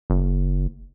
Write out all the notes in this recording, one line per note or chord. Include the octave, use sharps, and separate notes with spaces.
F#1